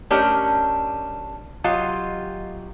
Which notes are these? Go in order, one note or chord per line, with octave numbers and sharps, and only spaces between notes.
A3 C#4 D4 G4 A#4 D#5
F#3 F4 G4 D#5